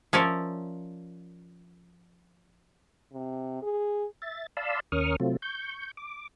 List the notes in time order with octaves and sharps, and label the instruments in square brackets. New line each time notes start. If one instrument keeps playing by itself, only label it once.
[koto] F3 C#4 A#4 D5 E5
[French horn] C3
G#4
[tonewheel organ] E5 A6
D5 F5 A5 B5 C6 E6
D#2 C#4 A#4 C#6 D#6 F6
C3 F#3 A3 C4 F4
C#6 G6
D6